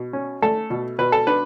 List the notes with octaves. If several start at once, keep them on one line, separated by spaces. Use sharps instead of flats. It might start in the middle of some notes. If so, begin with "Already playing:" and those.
Already playing: B2
C#4
A3 A4
B2
B2 B4
A4
D4 B4